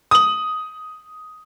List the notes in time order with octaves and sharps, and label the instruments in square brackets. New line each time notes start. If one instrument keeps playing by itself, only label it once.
[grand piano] D#6 F#7